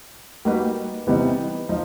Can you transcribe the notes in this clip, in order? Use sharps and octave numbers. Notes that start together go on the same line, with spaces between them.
G3 A#3 D#4 F#4 B4
C3 E3 G3 B3 D#4
F3 D#4